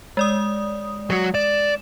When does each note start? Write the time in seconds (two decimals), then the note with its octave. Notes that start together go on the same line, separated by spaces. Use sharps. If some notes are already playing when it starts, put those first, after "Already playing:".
0.17 G#3 D5 D#6
1.10 F#3 F#4
1.35 D5 E7